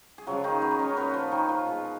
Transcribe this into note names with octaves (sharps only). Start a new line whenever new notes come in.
G#4
C#3 F3 F#3 G#3 F#4
D#3 D#4
B3 B4
D#5
C#4 C#5
A#4
A#2 F#3 B3 B4
F3 F4 F#4
D#3 D#4
F3 F4
B2 G#3